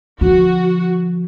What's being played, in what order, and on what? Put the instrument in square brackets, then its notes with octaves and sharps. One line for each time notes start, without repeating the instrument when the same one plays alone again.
[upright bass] D3 F3 [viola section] F#4